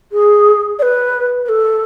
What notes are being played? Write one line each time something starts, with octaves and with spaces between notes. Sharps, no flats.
G#4
D5
B4
B4
A4